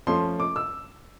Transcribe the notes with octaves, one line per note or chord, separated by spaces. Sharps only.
F3 A3 C#4 C6
D6
E6